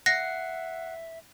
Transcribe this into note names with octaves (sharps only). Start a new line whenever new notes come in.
E5 F#5 A#6 C7